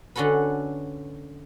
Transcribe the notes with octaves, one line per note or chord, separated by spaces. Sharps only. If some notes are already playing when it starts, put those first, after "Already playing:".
D3 C#4 F#4 A4 B4